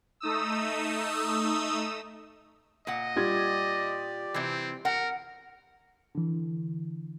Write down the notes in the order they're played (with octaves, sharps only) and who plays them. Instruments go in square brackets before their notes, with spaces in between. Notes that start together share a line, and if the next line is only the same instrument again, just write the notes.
[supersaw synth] A3 D#4 D#6 E6
[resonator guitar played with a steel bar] A#2 F#5 [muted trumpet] D#5
[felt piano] G3 F4 G#6 [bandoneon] G4 D5
[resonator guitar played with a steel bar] C3 E3 [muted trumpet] C4
[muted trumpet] A#4 [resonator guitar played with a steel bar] F#5
[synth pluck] D3 E3